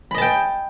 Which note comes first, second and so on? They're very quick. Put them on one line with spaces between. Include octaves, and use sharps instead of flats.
B5 D#5 A5 G5